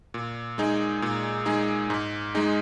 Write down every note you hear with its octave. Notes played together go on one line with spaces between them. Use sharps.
A#2
G#3 D#4 G#4
A#2
G#3 D#4 G#4
G#2
G#3 D#4 G#4